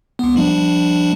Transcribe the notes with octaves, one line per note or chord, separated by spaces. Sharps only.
C#2 B3
F3 G3 D4